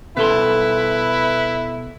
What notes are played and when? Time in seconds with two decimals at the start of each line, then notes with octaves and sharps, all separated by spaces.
0.17 B2 E4 A4 B4 C6